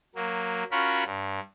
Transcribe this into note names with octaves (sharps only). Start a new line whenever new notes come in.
F#3 A#3
C#4 F4 F#4 A#4 B5
G2